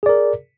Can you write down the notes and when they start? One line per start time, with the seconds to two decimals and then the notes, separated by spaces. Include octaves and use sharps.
0.03 G#4
0.06 D5
0.09 A#4